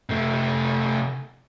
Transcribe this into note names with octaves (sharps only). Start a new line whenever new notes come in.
C3 A3